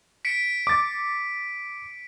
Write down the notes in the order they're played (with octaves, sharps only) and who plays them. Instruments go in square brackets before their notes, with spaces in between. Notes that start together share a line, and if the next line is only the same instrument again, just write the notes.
[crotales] B6 C#7 D7
[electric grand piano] D6 A6